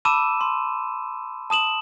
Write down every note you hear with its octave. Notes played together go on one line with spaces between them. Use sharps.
A5 B5 D6 E6 D#7 E7
C6
A5 D#6 E7 F#7